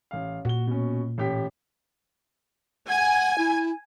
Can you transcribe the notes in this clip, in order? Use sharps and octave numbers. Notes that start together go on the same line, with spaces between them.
A1 F5
A#2 F#4 G7
B2 C#4
A1 G4 B6
F#5 G#5
E4